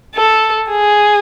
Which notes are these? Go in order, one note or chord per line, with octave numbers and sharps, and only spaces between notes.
A4
G#4